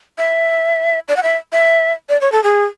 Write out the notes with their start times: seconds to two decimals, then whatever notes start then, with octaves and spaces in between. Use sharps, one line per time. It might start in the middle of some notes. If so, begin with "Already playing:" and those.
0.18 E5
1.08 D5
1.16 F#5
1.23 E5
1.52 E5
2.09 D5
2.21 C#5
2.32 A4
2.43 G#4